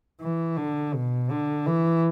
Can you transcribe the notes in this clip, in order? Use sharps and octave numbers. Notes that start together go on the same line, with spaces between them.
E3
D3
B2
D3
E3